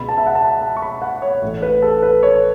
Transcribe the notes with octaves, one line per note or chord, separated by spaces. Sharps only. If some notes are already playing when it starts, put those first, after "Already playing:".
Already playing: C#2 B2 B3 B5
A5
E5
F#5
A5
A5
C#6
B5
F#5
C#5
A1 A2 A3
B4
A4
B4
C#5